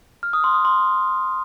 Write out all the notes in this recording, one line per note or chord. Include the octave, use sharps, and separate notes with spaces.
F6
D#6
C6
D#6
C6